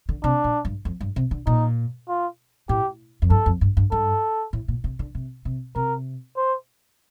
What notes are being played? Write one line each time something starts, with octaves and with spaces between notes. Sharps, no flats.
D3
C3 D4
A#2
G2
F2
G2
C3
D3
A#2 D#4
F4
A2 G4
F2
G2 A4
F2
G2
G2
G2 A4
A2
A#2
C3
D3
C3
C3
C3 A#4
C5